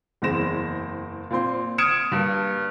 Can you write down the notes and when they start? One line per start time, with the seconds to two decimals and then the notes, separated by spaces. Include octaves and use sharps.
0.22 F#1 E2 G#3 C4 A#6 E7
1.30 A#2 C4 C6
1.78 D#6 F6 G#6 C#7 D7 E7
2.12 G2 A#3